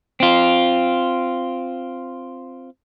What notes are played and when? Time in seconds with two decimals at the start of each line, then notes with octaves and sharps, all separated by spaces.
0.20 C4 F4